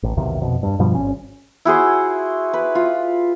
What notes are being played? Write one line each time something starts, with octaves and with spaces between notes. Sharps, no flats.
A1
B1 E2 C3 D#3
F2 B2
G2
G2 B2 F3 G3
G#1 C#4
E4 F#4 G#4 C5
B4
F4